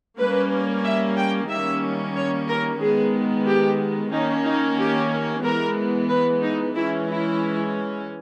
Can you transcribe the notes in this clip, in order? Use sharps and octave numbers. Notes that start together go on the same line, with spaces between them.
G3 A#3 C#4 B4
E5
G5
D#3 G3 A#3 C#4 E5
C#5
A#4
D#3 G#3 B3 G#4
G4
D#3 A#3 C#4 D#4
D#4
G4
E3 G#3 B3 A#4
B4
D#4
E3 G#3 C#4 E4
E4